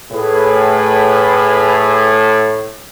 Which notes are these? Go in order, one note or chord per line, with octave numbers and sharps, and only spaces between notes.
A2 G#4 B4